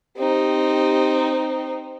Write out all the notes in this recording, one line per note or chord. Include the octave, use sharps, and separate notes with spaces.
C4 D#4 G4